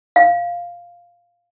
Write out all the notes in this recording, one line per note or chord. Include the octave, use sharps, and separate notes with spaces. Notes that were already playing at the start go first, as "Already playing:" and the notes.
F5